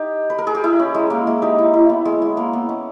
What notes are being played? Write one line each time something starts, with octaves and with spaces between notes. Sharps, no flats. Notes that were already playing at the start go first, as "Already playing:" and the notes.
Already playing: D#4 G4
B4
A#4
G#4
G4
E4
C#4
G#3
A#3
G#3
D#4 G4
E4
E4
B3
G#3
G#3
A#3
B3
C#4